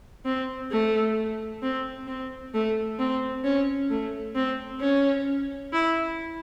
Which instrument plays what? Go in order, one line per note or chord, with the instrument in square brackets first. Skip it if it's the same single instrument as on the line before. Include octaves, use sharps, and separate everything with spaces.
[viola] C4
A3
C4
C4
A3
C4
C#4
A3
C4
C#4
E4